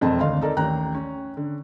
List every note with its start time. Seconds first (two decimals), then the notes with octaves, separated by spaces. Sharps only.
0.01 E1 F2 G#2 C4 D#5 A5
0.20 G#1 D2 D#5 F5 C6
0.41 D#4 A4 A#4 D5
0.57 A1 D#2 G5 A#5 F#6
0.94 C#4
1.37 D3